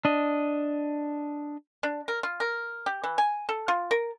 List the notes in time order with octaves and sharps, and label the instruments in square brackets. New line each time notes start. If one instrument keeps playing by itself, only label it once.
[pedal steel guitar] D4 D#5
[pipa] D4
A#4
F4
A#4
G4
E3
G#5
A4
F4
A#4